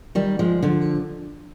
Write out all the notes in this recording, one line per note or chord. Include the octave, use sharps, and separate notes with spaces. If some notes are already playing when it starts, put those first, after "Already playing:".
D#3 G3
F3 G#3
D3 F3